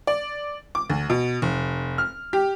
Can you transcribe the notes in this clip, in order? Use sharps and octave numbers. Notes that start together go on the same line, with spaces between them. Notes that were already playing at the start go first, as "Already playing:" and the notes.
D5
D6
D2
B2
F1
F6
G4